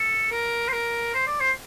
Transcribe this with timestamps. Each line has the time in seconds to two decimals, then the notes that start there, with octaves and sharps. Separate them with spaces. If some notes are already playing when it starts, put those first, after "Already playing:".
Already playing: A4
0.31 A#4
0.68 C5
0.73 A#4
1.14 C5
1.27 D5
1.40 C5